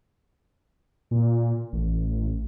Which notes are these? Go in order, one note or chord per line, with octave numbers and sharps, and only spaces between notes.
A#2
A1